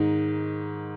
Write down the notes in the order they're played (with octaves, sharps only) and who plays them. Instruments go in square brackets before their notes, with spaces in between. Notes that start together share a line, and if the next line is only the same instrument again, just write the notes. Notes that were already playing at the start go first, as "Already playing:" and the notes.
Already playing: [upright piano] G#2 D#3 D#4